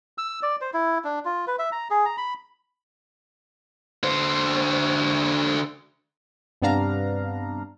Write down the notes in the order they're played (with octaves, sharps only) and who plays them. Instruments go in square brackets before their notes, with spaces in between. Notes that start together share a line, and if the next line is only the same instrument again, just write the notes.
[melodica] E6
D5
C5
E4
D4
F4
B4
E5
A#5
G#4
A#5
B5
[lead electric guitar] D3 C5
[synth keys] G2 C3 B3 D4 F5 A#5